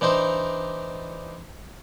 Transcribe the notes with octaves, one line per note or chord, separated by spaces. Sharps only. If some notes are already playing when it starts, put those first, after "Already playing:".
E3 D4 D#4 C5